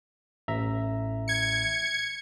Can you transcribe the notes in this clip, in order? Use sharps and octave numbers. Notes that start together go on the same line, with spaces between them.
A1 E5 A#5
G#6 C#7